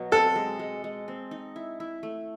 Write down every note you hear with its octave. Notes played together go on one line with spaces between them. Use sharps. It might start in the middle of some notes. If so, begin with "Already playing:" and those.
Already playing: B2 F#3
C4 A4
G#3
G#3
G#3
C4
D#4
E4
E4
A3